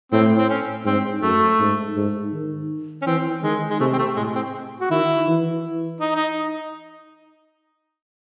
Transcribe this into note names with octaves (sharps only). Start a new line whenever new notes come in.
A2 C4
C4
C#4
G#2 C4
F#2 A3
G#2
G#2
D#3
C#4
E3 C4
D#3 G#3
G#3
C3 A3
C4
A3
A2 G#3
C4
F#4
D#3 E4
E3
D#4
D#4